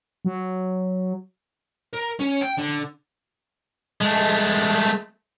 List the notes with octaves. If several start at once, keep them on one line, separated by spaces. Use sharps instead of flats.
F#3
A#4
C#4
G5
D3
G#3 A3